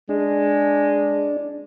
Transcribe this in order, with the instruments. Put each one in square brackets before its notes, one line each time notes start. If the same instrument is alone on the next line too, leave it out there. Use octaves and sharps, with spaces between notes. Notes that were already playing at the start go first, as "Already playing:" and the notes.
[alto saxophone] G#3 [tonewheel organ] D4